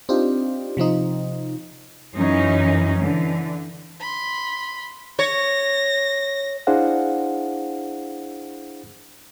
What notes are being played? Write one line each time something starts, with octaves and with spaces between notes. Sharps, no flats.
C4 D4 D#4 F4 G4
C3 F3 C4 D#4
F#2 E3 C#4 D#4
D3 E3
B5 C6
C#5 A#6
D4 E4 G#4 C5 F5 F#5